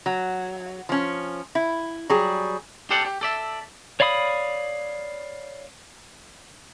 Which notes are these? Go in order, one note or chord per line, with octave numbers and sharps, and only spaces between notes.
F#3
F3 C#4
E4
F#3 G3 G#4
G4 A4 C5 D5 F#5
G4
A4 D5 E5
C#5 D5 F5 B5 D#6